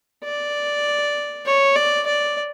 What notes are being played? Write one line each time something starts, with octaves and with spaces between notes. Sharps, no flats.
D5
C#5
D5
D5